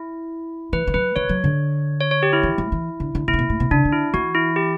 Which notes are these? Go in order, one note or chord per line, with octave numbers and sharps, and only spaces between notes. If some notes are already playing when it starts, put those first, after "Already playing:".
Already playing: E4
E3 B4
E3
F#3 B4
E3 C#5
F#3
D3
C#5
C#5
G4
E4
E3
F#3
E3
D3
D3
B2 E4
C#3
B2
A2
B2
C#3 D4
D3
E4
E3 F#4
E4
G4